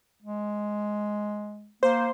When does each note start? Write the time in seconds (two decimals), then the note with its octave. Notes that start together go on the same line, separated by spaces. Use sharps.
0.22 G#3
1.83 A#3 C5